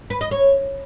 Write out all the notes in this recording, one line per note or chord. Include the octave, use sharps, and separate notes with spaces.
B4
D#5
C#5